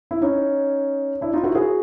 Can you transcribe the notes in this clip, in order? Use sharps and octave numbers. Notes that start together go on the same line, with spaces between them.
E4
C#4 D#4
D4 E4
D#4 F4
E4 F#4
F#4 G#4